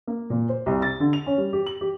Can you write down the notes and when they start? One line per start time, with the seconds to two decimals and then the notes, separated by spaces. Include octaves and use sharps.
0.07 A#3
0.30 A#2
0.49 C5
0.66 C2
0.82 A6
1.00 D3
1.13 F7
1.26 C#4
1.38 G3
1.53 G4
1.66 F#7
1.81 G4